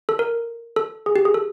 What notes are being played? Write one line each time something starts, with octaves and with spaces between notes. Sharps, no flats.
A4
A#4
A4
G#4
G4
G#4
A4